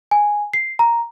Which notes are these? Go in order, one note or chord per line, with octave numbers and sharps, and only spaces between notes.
G#5
C7
A#5